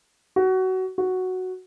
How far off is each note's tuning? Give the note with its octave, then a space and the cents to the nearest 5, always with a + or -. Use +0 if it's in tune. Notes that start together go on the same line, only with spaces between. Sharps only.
F#4 +20
F#4 +0